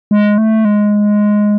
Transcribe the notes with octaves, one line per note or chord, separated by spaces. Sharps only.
G#3
A3
G#3